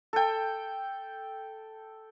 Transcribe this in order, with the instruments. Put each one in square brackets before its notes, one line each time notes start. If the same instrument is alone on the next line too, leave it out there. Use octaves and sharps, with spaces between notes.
[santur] A4 G5